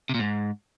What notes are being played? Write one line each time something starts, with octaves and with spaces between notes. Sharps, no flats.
C3
A#2
G#2